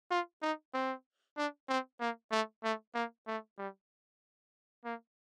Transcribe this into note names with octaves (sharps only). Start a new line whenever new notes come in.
F4
D#4
C4
D4
C4
A#3
A3
A3
A#3
A3
G3
A#3